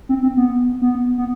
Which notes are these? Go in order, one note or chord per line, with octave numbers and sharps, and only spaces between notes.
C4
C4
B3
B3
B3